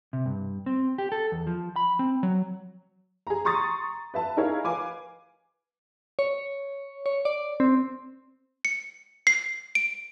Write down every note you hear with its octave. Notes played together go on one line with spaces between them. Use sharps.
C3
G2
C4
G4
A4
E2
F3
B5
C4
F#3
G#4 A#5
A#5 C6 C#6 D#6 A6
B4 E5 A5
D#4 E4 G#4 A#4 C#5 F5
B4 F5 G#5 D6
C#5
C#5
D5
C4
C#7
C7
D7